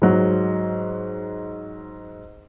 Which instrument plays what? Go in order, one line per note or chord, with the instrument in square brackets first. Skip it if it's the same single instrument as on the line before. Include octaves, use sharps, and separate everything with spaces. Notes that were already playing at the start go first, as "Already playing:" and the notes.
[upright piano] G#2 F#3